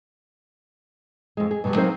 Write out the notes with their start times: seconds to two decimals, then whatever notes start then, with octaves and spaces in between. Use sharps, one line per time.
1.37 F2 G#3
1.51 G#4
1.64 G2 B2 D#3 F#3 G3
1.75 F#3 C4 D#4 A#4 C5 F5